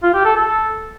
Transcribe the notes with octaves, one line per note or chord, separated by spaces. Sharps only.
F4
G4
A4
A4